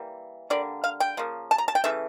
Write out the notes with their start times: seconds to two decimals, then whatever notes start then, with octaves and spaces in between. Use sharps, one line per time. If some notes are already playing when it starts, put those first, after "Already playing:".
Already playing: E3 G3 A#3
0.50 D3 G3 A#3 D5
0.84 F5
1.00 G5
1.17 C#3 F3 A#3
1.51 A5
1.58 A#5
1.68 A5
1.75 G5
1.84 C#3 E3 A3 E5